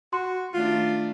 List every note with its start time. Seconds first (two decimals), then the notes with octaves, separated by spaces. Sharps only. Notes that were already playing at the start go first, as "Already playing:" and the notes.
0.13 F#4 C6
0.53 D#3 A3 D4 F4